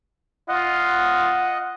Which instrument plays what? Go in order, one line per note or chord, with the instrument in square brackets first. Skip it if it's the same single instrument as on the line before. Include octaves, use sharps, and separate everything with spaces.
[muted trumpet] F4 [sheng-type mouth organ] D#5 F#5